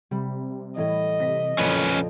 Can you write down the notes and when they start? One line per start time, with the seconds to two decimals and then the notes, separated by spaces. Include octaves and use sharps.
0.11 C3 G3
0.77 A2 E3 D#5
1.20 C3 A#6 B6
1.58 A1 F2 A#2 C#3 C#4 B4